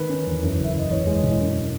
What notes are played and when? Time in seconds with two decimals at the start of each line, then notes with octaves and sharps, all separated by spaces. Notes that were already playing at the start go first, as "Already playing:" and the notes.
Already playing: D#3 B4
0.09 C#4
0.26 E2
0.43 F#2
0.58 F#1
0.64 E5
0.74 F#1 D#5
0.90 E2 C#5
1.07 G#3
1.16 D#5
1.23 E1
1.39 F#2